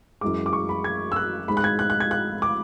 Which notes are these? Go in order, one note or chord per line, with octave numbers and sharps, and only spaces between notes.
F#2 E3 G#3 D6
D6
C#6
B5
G#6
E6
F#6
G#2 G#3 B5
F#6
G#6
F#6
F#6
G#6
F#6
D6